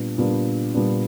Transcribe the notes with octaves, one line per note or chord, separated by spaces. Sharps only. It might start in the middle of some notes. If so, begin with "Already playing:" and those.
Already playing: A#2 G3 B3 D4
A#2 G3 B3 D4
A#2 G3 B3 D4